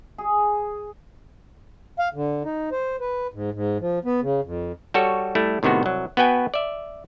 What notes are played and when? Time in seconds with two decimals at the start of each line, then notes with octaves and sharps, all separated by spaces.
0.18 G#4
1.99 F5
2.14 D3
2.45 D#4
2.72 C5
3.00 B4
3.34 G#2
3.54 G#2
3.80 F3
4.05 B3
4.22 C#3
4.44 F2
4.94 G3 F#4 A4 C#5
5.35 G3 A3 E4
5.63 A2 C3 D#3 B3 F#4
5.83 C2 F#3
6.17 B3 F#4 B4 G5 G#5
6.54 D5 E5